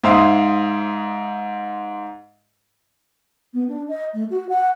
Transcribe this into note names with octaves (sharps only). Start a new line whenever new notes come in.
G#2 C5 E5 F5 C6 D#6
B3
D4
D#5
A3
F#4
F#5